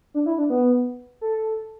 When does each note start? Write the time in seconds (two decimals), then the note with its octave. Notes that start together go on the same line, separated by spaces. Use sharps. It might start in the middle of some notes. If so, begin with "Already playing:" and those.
0.14 D4
0.26 E4
0.38 D4
0.50 B3
1.21 A4